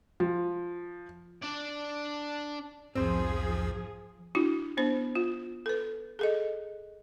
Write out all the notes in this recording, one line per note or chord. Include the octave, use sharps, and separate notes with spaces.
F3
D4 D5
B1 E2 G#2 F3 C4 G#4 C5
D4 E4 F#4
B3 D4 C5
F4
A4 B4
G#4 A4 D#5